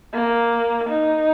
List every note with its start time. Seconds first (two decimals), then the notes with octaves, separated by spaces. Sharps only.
0.13 A#3
0.89 D#4